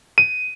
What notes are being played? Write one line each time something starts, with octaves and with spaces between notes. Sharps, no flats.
D#7